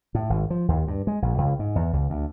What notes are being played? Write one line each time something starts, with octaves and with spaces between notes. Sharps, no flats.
A2
G#1
F3
D#2
G2
G#3
A#1
C#2
G#2
E2
C#2
D2